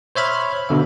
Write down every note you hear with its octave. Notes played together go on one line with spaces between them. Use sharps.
C5 C#5 E5 B5 F6
B2 D3 E5